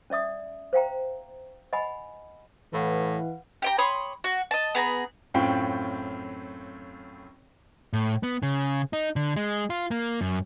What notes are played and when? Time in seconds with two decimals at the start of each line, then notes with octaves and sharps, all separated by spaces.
0.10 C#4 D5 E5 D#6
0.73 C5 F5 G5 A#5
1.73 D#5 F#5 G#5 B5
2.73 A2 E3 B4 F5 F#5
3.62 G4 G5 A#5
3.78 C#5 B5 C6 D#6
4.24 F#4
4.51 D#5 A5
4.75 B3 G#4 A5 A#5
5.34 F#2 A2 C4 F4 G5
7.93 A2
8.23 B3
8.43 C#3
8.93 D#4
9.16 D3
9.36 G#3
9.70 F4
9.91 A#3
10.21 F#2